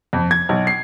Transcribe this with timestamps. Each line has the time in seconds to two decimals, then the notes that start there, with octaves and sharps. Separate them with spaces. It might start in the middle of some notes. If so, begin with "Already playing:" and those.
0.13 F2
0.31 G#6
0.49 B1
0.67 C7